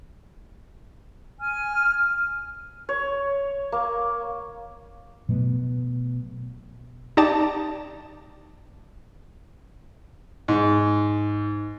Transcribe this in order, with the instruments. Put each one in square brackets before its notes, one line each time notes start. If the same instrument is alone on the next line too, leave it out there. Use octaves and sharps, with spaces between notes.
[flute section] G#5 F6
[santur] C#5
A#3
[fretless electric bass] B2 F#3 A3 B3
[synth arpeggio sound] D#4 G4 D5 A5
[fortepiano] G#2